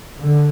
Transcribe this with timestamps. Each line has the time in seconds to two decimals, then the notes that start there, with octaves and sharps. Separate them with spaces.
0.21 D3